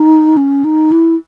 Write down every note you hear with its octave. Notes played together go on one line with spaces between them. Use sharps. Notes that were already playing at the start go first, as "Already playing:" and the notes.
Already playing: D#4
C#4
D#4
E4